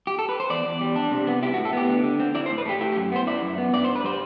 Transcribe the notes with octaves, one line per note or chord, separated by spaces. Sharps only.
G4
A4
B4
C5
E2 D5
E2
G3
D4
C3
B3
E4 G4
F#4
A2
A4
B3 G4
D3
D3
C4
E4 D5
C5
A2
B4
A3 G4
E4 G4
G4
F#2
B3 C5
E4 D5
F#2
B3
G2 D5
G2 C5
B4
G3 C5